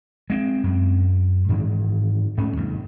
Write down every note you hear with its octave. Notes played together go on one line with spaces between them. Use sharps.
G#3 C4
F#2
G#2 D#3 E3
G#2 A3 C#4
D#2 G#2 C3